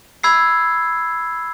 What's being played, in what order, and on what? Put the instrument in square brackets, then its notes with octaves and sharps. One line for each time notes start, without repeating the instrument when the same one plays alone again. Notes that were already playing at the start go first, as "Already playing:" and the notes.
[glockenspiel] B5 E6 G#6 C7